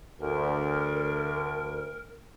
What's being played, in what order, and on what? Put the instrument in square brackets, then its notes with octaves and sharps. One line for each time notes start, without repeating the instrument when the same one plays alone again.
[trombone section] D2 [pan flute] A#4